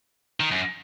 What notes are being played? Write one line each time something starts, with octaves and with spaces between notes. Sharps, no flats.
D#3
F#2